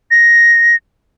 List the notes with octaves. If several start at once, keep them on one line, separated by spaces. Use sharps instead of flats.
A#6